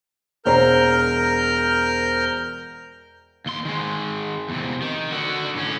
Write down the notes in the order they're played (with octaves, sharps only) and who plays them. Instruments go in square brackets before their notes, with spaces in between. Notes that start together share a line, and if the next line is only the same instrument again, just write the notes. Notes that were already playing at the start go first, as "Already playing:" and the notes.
[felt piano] E1 C5 A#5 [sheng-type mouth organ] A#4 F6 G6
[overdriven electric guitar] D#2 C6
D#3 G#3
E2 C3
D#3
D3 F#4
A2 C#4